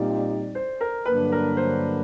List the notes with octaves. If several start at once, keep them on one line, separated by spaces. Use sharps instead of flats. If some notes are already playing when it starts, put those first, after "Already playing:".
Already playing: A#2 G3 C4 D#4 G4 D5
C5
A#4
G2 D3 F#3 A#3 D4 B4
A#4
C5